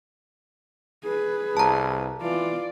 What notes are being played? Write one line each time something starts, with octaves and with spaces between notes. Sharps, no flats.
G#4 B4
C2 A5 A#5
E3 F4 D5